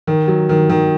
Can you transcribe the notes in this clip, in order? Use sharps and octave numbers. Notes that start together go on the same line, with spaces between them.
D#3
F#3
D#3
D#3